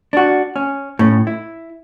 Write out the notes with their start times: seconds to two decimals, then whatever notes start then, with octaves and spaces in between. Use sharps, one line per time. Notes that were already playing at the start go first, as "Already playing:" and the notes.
0.13 D4 F#4
0.56 C#4
0.99 A2 C#4
1.27 E4